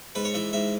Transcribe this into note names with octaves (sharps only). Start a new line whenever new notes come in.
G#2 B4
C#5
E3 E5
G#2 E5